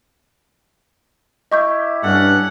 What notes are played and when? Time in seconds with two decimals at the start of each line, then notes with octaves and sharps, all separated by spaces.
1.52 E4 G4 D#5 C#6 G6
2.04 G2 C#4 A4 F#5